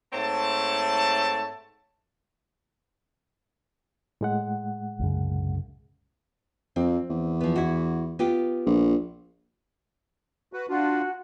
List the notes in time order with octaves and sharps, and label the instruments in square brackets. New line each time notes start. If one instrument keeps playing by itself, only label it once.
[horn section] G#2 A3 C4 C#5 A5
[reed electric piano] A2 G#3 F#5
[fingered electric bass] C2 F#2 C#3
[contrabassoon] F2 [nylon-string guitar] C4
[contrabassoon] E2
[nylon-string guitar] F3 B3
E4 F#4
B3 F4 G4
[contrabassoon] A#1
[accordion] F#4 B4
[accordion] D4 F4 [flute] F#4